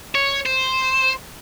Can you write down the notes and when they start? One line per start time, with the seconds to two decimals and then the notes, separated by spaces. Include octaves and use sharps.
0.15 C#5
0.46 C5